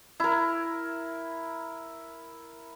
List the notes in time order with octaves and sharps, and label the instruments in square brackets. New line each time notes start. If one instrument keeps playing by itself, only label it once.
[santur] E4 A#4